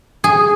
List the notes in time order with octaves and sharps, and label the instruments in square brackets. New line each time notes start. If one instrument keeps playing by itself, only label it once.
[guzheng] G#4